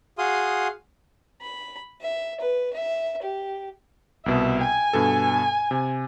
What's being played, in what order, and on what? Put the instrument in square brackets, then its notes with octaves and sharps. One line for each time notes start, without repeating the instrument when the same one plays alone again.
[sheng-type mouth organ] F#4 G#4 F5 C6 D#6
[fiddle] B5
E5
B4
E5
G4
[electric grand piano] C2 B2 [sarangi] E5
[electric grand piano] G5 [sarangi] G#5
[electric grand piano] G2 B2 A4
C3